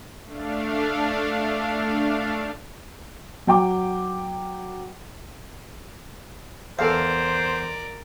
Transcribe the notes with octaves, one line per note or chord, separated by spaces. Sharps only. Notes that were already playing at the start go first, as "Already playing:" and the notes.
A3 D4 F5
F#3 G5 D6
E2 A4 A#4 C5 D5 F5